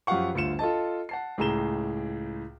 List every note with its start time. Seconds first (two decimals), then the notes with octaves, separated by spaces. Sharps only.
0.07 F#2 F3 G4 F5 F#5 C#6
0.34 G1 D2 F4 C#7 E7
0.59 F4 A4 D#5 A5
1.09 F#5 A5 C7
1.38 C#2 A2 G#4 A#5 E7 G7